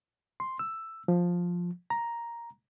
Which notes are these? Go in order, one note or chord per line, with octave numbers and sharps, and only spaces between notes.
C6
E6
F3
A#5